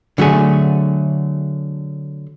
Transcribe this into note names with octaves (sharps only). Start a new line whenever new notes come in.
D3 F#3 A3 G#4